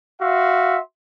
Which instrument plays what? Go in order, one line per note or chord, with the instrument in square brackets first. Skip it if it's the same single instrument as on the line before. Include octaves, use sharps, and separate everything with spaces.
[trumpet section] F#4 E5 F5 C6